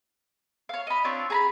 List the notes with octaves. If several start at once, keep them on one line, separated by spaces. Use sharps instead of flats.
C#5 F5
D#5 B5
C4 D4 F4 C#5
G#4 A#5 B5